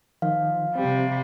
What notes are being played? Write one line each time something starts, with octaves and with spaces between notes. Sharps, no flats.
D#3 F3 F5
C3 G3 C4 G4